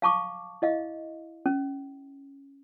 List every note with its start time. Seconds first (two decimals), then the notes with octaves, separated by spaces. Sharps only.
0.02 F5 A5 C#6 D6
0.62 E4 D#5 F5
1.46 C#4